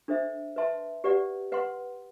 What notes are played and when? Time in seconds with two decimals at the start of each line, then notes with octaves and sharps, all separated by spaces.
0.08 D4 A4 C5 E5
0.56 B4 E5 A5 C6
1.04 G4 B4 D5 F#5
1.52 B4 F#5 C6